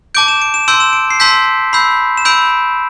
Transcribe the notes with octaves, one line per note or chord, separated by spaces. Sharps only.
A5 D6 G6 D7
E7
D7
E7
A5 C6 E6 G6 D7
E7
D7
C7
A5 C6 E6 G6 B6
B5 E6 G6 C7
E7
B5 E6 G6 D7